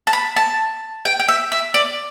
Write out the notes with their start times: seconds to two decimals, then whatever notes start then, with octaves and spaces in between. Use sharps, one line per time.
0.07 A5
0.13 B5
0.36 A5
1.05 G5
1.20 G5
1.28 E5
1.52 E5
1.74 D5